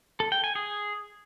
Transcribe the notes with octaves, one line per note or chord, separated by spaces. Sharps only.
A4
G5
G#5
G#4